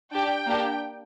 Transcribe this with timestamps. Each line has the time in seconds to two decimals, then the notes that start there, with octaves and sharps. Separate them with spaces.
0.11 D4 G4 G5
0.46 A#3 D4 G4